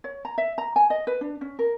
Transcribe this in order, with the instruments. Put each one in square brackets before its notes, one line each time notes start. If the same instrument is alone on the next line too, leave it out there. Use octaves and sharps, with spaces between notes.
[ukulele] C#5
A#5
E5
A#5
G#5
D#5
B4
D4
C#4
A#4